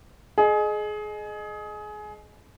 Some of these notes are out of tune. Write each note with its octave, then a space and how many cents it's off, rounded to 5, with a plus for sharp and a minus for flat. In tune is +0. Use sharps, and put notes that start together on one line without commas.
G#4 +25 D#5 -20